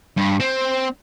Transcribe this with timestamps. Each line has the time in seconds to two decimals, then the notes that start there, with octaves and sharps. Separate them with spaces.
0.17 G2
0.40 C4